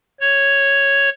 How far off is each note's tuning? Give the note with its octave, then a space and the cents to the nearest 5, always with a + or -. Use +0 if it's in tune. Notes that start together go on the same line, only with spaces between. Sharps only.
C#5 +0